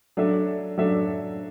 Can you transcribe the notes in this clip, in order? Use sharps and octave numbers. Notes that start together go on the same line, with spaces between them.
F#3 D4 A4 E5
F#3 D4 A4 E5